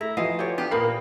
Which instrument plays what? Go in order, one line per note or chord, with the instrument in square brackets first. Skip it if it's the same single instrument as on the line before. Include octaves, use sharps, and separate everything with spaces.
[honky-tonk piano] A3 [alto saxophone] E4 [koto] A#5
[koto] E3 [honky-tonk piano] F3 F4 F#4 [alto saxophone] D#5 [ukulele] F5
[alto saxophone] D3 [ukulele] G4 C#5
[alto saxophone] B3 [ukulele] D4 F4 [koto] G4
[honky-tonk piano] A#2 D#6 C7 [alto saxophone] A#3 [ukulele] A#4 C5 B5